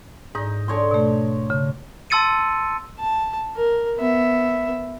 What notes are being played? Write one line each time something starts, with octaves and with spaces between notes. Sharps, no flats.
G#2 D#4
D3 C#5 C6
B2 A3
C#3
A5 C6 E6 A6 C#7 D#7
A5
A#4
B3 E5